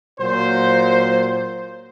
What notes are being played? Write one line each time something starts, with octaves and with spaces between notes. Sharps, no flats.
A#2 F#3 C5